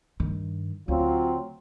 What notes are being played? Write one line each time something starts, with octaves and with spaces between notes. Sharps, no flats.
G2 D#3
D2 F#3 C4 F4